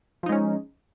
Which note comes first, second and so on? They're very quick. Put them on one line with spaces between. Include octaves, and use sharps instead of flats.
F3 D#4 G#3 C#4